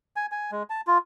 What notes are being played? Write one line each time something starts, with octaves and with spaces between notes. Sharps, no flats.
G#5
G#5
G#3
A5
F4